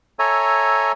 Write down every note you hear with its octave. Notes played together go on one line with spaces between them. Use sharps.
A4 C#5 E5 G#5 A#5